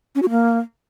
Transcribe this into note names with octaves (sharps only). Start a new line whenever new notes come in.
C#4
F#4
A#3